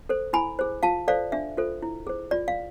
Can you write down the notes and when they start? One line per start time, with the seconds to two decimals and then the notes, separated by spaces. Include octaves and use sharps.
0.09 A4 C5
0.33 E4 G#5 B5
0.59 G#4 C5
0.83 F4 F5 A5
1.08 A4 C5 D5 F5
1.32 D4 E5
1.57 F4 A4 C5
1.82 E4
2.07 G#4 C5
2.31 F4 D5
2.48 F5